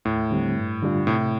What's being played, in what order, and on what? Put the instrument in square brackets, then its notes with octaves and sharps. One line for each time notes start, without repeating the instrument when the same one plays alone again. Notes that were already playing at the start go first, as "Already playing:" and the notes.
[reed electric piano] D#2 [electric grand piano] A2
[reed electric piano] D3 G3 C4
G2
D3 G3 D4 F4
[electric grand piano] A2 [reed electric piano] C3